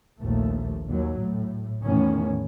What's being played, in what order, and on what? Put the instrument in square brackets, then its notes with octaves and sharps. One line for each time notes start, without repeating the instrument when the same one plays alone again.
[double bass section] A#1 D#2 A3
D#2 F#3
A2
E2 A2 D#3 C#4